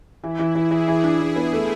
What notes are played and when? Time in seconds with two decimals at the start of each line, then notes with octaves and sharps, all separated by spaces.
0.23 E3 E4
0.39 E3
0.55 E3 G#4
0.71 E3
0.88 E3
1.04 D4
1.20 E3
1.36 B3
1.53 A3